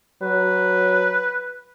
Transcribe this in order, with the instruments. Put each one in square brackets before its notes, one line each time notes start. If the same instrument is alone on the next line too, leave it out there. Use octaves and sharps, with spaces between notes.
[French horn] F#3 [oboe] B4